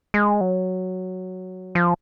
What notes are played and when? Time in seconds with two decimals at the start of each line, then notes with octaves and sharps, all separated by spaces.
0.14 G#3
0.41 F#3
1.75 F3